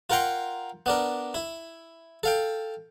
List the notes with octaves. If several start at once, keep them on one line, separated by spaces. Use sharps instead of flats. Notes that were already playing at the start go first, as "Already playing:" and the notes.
F4 A#4 F#5 G5 A#5 C6
B3 D4 A#4
E4
A4 F5 G5